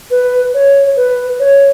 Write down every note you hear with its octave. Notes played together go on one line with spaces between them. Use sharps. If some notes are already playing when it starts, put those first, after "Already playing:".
B4
C#5
B4
C#5